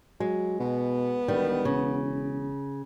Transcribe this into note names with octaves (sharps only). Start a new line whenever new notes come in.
F#3 G#3
B2 B3
E1 D#3 G3
C#3